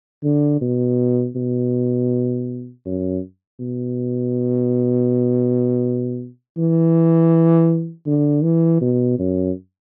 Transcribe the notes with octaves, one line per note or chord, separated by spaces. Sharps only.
D3
B2
B2
F#2
B2
E3
D3
E3
B2
F#2